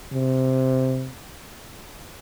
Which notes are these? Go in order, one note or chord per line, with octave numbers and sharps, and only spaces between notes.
C3